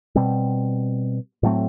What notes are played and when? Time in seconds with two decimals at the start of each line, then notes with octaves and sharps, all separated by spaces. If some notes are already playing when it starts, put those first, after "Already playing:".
0.15 B2 G3 C4
1.43 A2 F#3 A3 C4